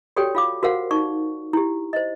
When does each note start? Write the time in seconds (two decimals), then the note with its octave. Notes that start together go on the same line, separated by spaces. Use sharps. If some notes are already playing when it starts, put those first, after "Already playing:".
0.16 F#4 G4 A4 C#5 D5 G5
0.35 F4 F5 D6
0.63 F#4 A#4 C5 F5 F#5
0.91 D#4 D5 C#6
1.53 E4 G4
1.93 C5 D#5